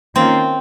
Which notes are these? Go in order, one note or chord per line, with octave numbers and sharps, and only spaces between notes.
D#3 A#3 C4 C#4 F4